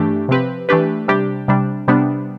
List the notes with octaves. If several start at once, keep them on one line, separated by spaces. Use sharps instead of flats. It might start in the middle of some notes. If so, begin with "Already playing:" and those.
Already playing: G2 E3 A3 D4 G4
C3 F3 C4 G4 B4
E3 A3 D4 G4 B4
C3 G3 D4 G4
C3 G3 D4
C3 G3 B3 D4